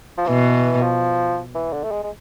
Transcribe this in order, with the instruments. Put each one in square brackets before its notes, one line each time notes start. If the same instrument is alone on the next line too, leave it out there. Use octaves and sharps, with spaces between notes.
[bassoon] F3
[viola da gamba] B2 [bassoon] E3
[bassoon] F3
E3
D3
A3
G#3
G#3